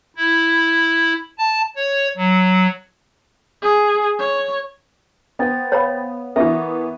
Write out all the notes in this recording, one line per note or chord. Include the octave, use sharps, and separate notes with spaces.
E4
A5
C#5
F#3
G#4
C#5
B3 C5 G5 A6
C#5 F5 B5
E3 B3 A#4 E5 C#6 D6